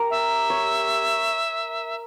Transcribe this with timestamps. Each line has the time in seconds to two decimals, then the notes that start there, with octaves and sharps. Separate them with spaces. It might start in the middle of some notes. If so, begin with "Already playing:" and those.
Already playing: G4 A#4
0.10 E5
0.50 C#5